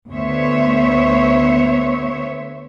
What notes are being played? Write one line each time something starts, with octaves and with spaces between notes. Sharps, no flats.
D2 B3 C5 C#5 E5